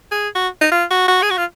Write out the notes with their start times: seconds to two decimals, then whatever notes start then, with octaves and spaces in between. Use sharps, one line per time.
0.12 G#4
0.35 F#4
0.61 D#4
0.72 F4
0.91 F#4
1.08 F#4
1.22 G#4
1.30 F#4
1.37 F4